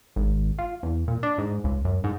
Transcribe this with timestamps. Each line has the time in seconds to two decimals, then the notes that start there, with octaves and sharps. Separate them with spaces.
0.16 G#1
0.59 F4
0.83 E2
1.08 A#2
1.23 D4
1.38 G#2
1.64 C#2
1.85 F#2
2.04 G#2